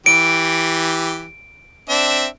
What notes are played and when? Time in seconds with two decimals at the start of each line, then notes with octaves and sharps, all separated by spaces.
0.06 E3 G4 D7
1.89 C4 D4 E5